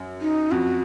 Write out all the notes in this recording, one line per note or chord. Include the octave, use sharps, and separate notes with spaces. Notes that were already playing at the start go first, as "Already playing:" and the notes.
Already playing: F#2
D#4
F2 F#4